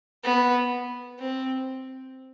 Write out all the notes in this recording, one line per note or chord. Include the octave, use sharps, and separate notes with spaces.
B3
C4